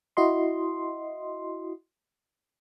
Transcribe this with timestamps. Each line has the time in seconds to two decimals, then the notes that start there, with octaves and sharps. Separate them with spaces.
0.17 E4 F#4 D#5 C6